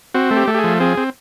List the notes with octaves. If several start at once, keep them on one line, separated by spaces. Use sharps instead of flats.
C4 F#4
A3
G4
A3
G4
G#4
F3
C4 G#4
C4